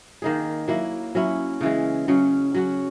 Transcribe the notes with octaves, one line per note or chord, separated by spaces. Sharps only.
D#3 A#3 D#4 G#4
F#3 A#3 E4
F#3 C#4 E4
C#3 E3 G#3
C#3 F#3 C#4
F#3 C#4 F#4